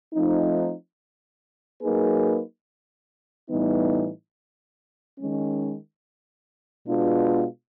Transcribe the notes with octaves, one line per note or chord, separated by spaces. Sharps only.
F3 A3 C4 D#4
F#3 A#3 D#4 G#4 B4
A2 E3 G3 B3 D#4
D#3 G#3 C#4
B2 G#3 B3 D4 F4